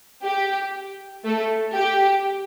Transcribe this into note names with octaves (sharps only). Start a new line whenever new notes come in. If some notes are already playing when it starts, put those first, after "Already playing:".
G4
A3 A4
G4